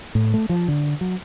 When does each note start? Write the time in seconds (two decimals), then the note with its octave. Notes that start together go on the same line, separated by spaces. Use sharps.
0.15 A2
0.34 A3
0.49 F3
0.68 D3
1.01 F#3